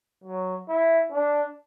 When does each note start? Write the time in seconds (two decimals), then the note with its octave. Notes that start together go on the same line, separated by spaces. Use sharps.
0.24 F#3
0.69 E4
1.12 D4